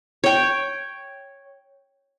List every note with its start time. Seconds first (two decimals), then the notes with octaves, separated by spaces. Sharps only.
0.24 C#5 G5